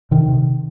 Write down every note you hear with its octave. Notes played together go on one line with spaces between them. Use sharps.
C3 D#3
C3